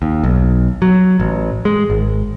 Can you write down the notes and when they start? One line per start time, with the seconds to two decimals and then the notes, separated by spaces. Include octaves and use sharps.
0.02 D#2
0.23 B1
0.82 F#3
1.20 A1
1.65 G#3
1.90 G#1